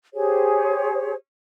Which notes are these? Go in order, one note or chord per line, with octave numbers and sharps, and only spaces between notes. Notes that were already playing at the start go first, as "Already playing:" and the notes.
G4 G#4 C5 C#5